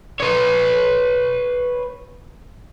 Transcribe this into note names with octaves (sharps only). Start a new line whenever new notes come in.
B4 C#5